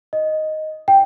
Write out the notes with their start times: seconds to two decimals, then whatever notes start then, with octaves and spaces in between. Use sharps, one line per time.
0.13 D#5
0.88 G5